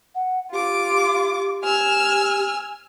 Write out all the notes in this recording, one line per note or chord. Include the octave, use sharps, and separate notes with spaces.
F#5
F4 G4 D6
G#5 E6 F6